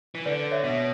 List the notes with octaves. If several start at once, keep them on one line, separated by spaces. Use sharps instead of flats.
E3
D3 B4 D5
C#5 E5
B2
C#5